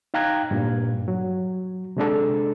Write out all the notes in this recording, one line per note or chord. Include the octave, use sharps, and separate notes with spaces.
D#4 F5 G5 A#5 F#6 G#6
G2 A#2
F#3
C3 G#3 D4 A4